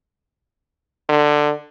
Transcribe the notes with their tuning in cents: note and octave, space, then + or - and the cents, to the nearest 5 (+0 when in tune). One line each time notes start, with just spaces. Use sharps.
D3 +15